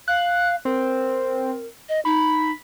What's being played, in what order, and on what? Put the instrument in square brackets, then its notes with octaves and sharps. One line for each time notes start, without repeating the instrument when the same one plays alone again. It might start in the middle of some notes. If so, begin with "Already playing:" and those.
[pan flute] F5 [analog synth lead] F#6
[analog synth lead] C4 [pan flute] A#4
[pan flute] D#5
[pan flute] D#4 [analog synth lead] B5